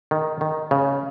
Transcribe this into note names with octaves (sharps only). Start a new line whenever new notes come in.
D#3
D#3
C#3